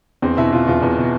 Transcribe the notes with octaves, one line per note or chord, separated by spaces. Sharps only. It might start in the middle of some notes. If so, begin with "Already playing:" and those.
E2 C4
B2 E4
B2 F4
E2 F4
E2 B3
B2